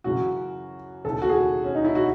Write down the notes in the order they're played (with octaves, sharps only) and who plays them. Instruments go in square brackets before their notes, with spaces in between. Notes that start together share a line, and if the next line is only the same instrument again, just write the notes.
[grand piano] F#2 C#3 E3 F#4
D#2 C#3 E3 A4
F#4
G#4
C#4
D#4
E4
F#4